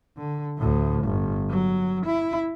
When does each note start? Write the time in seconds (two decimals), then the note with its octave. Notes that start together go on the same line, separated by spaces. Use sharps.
0.18 D3
0.58 D2 A2
1.04 G1
1.50 F#3
2.06 E4